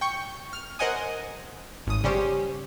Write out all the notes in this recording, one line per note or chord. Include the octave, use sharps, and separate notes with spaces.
G5 C#6 G6
F6
A#4 C5 D#5 F#5 G#5 D#6
G#1 D#6
C#3 G3 C#4 G4 C5